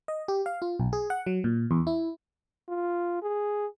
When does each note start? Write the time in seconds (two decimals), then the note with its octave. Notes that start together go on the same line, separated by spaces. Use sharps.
0.08 D#5
0.28 G4
0.46 F5
0.62 F4
0.80 B1
0.93 G#4
1.10 F#5
1.27 F#3
1.44 A#2
1.71 E2
1.87 E4
2.68 F4
3.22 G#4